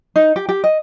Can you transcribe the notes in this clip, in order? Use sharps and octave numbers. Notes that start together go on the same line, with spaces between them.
D#4
G4
G4
D#5